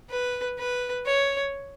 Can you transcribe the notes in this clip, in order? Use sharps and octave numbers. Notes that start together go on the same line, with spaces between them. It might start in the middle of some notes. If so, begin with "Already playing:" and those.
B4
B4
C#5